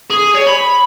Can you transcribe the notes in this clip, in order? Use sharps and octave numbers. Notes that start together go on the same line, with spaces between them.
G#4
C#5
B5